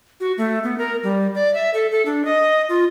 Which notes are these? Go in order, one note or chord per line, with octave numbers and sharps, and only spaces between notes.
F#4
A3
B3
A#4
G3
D5
E5
A4
A4
D4
D#5
F4